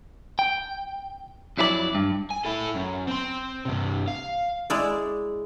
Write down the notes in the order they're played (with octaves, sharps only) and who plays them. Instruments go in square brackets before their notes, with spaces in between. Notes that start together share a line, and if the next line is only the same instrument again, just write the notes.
[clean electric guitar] G5
F2 F#3 E4 G4 D5
G2
[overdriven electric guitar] G#5
E4 A4
F#2
C4 C6
G2 C3
F5
[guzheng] G#3 E4 D5